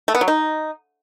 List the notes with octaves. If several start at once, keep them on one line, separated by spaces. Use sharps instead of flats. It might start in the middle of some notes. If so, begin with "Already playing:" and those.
A3
B3
F#3
D#4